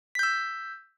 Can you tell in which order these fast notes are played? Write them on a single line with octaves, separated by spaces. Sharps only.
B6 G6 E6